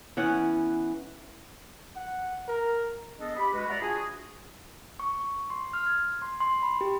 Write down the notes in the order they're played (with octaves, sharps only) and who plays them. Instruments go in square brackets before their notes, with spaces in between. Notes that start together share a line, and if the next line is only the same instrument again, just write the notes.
[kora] E3 B3 C#4 F#5
[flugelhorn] F#5
A#4
[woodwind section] B3 D4 G#4 A4 D#5
G4 B5
G#3 F#4 B4
D5 E5 F#5 A#5 B5
D4 F4 F#4 G#4
[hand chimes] C#6
C#6
C6
F6
G#6
C6
C6
B5
G4